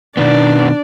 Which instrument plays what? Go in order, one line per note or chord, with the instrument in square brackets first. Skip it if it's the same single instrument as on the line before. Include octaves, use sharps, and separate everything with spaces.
[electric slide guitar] B2 D#3 B3 [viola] D4 D5